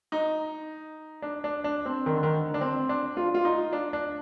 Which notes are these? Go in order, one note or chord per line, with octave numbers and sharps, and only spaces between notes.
D#4
D4
D4
D4
C4
D#3
D3
D#3
D3
D4
C4
D4
F4
F4
D#4
D4
D4